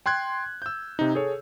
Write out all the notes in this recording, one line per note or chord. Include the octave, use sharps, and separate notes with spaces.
G5 C6 F#6 G#6
E6 G6
C3 D#4
G#4 A4 C#5